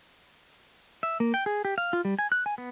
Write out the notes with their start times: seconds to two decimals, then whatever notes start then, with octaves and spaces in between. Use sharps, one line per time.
1.03 E5
1.20 A#3
1.34 G5
1.46 G#4
1.65 G4
1.78 F5
1.93 F4
2.05 G3
2.19 G#5
2.32 F#6
2.46 G#5
2.58 B3